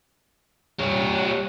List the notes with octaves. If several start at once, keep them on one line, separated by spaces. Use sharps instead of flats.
G3 C#5